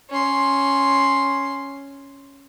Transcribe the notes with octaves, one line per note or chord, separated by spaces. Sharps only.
C#4 C6